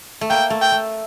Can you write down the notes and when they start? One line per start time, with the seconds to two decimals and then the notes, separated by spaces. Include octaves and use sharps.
0.21 A3
0.30 A#3 G5
0.50 A3
0.61 G5
0.72 A3